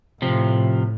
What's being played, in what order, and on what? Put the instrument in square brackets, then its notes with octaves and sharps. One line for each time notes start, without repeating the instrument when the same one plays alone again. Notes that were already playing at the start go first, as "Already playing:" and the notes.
[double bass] A2 [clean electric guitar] C3 F3